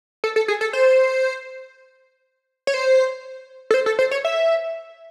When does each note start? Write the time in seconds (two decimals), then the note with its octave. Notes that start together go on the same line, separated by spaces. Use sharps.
0.24 A4
0.36 A4
0.48 G#4
0.61 A4
0.73 C5
2.67 C#5
2.74 C5
3.71 A4
3.74 C5
3.86 A4
3.99 C5
4.11 C#5
4.25 E5